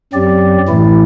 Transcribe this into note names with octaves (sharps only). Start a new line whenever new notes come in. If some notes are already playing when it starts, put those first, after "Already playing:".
F#2 F#3 C4 G4 D5
A2 E3 A3 E4